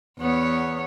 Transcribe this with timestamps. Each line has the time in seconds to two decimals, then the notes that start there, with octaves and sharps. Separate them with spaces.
0.19 E2 B3 C#5